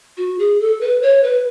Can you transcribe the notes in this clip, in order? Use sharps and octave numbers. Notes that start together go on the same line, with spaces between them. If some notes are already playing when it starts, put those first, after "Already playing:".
F#4
G#4
A4
B4
C#5
B4